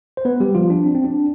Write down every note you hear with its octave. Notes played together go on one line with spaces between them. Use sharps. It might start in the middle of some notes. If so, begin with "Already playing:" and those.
C5
B3 B4
G3 G4
F3 F4
D4
C4
C4
D4